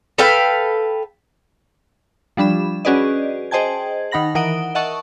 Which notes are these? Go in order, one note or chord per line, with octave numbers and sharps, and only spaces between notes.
A4 B4 F5 G5
F3 G3 D4 B5 E7
C#4 F#4 G#4 B4 D5 D#5
G#4 C5 D#5 G5 A5 G#6
D#3 D#4 F#5 B5 A#6 F#7
E3 A#4 F#5 D#6 D7 G7
D#5 E5 F#5 A5 C#6